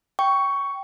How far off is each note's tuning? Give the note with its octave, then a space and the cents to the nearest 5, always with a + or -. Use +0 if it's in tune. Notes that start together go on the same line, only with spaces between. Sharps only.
G5 -5 C#6 +10